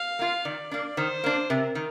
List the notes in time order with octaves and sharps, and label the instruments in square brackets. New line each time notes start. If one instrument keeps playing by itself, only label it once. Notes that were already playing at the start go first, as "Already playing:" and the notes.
Already playing: [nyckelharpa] F5
[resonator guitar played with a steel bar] A#3 F4
[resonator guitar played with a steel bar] D#3 [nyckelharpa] D5
[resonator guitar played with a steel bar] A#3 D4
[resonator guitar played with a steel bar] D#3 [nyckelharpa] C5
[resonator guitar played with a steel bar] A#3 D4
[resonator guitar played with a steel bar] C3 [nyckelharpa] A#4
[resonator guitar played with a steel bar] D#3